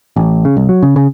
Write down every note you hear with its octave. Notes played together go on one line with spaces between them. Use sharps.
A1
C#3
C2
F#3
C#3
C#3